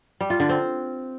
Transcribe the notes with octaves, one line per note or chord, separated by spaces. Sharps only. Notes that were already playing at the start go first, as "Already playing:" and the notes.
G3
F4
D3
C4